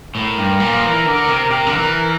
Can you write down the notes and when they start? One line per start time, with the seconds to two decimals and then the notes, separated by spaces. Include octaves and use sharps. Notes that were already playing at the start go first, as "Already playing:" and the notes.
0.15 A2 A#4
0.38 G2
0.60 A#2
0.72 F3
0.83 E3
1.06 D3
1.28 C3
1.51 C3
1.66 D3
1.73 E3